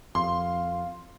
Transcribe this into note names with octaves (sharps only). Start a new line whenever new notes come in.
F2 F5 C6